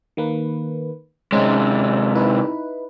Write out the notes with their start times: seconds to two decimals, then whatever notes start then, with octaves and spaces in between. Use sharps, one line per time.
0.17 D#3 A#3 B4
1.32 C3 G#3 C4 C#4 D#4
2.15 D#4 E4 B4